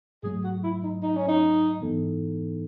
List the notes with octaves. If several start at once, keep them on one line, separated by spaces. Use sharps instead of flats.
G#2 F#3 A3 G#4
F#4
E4
D#4
D#4
C#4
D#4
G#2 E3 B3 D#4 A4